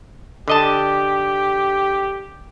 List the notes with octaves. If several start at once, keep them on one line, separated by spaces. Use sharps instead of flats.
D3 G4 D#5 A5